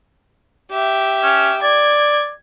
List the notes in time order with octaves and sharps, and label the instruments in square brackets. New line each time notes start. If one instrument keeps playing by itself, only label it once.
[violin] G4 E5
[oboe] C#4
[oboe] D5 [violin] G#6